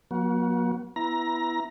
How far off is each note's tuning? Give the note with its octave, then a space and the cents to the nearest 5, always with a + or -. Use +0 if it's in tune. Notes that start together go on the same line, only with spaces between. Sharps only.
F#3 -35 A#3 +45 F#4 +20
B3 +0 E4 +5 A#5 +20